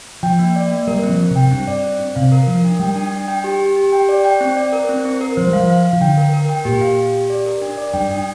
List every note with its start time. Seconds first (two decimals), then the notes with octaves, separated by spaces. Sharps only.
0.23 F3 G5
0.39 A#3
0.56 D5
0.71 A#3
0.87 G3 A#4
1.03 C4
1.09 F3
1.19 C4
1.31 C3 G5
1.51 G2 C4
1.67 D5
1.84 C4
2.00 C4
2.16 C3 F5
2.32 A#4
2.47 F3 A#4
2.64 D4
2.79 G3 G5
2.96 D4
3.12 D4
3.28 G5
3.44 G4
3.60 G4
3.76 G4
3.92 G5
4.09 D5
4.24 G5
4.41 C4
4.57 D5
4.73 A#4
4.89 C4
5.05 C4
5.21 A#4
5.37 F3 C5
5.47 G3
5.53 F3 F5
5.69 F5
5.85 F5
5.93 F3
6.01 D3 G5
6.17 A#4
6.33 A#4
6.49 G5
6.65 A#2 G4
6.81 F5
6.97 G4
7.14 G4
7.30 D5
7.46 A#4
7.61 D4
7.77 D5
7.94 G2 G5
8.10 D4